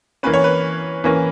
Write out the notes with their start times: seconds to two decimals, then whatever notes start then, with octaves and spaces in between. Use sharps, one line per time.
0.23 E3 A#3 C#4 B4
0.34 C#5
0.44 B4
1.04 E3 A#3 C#4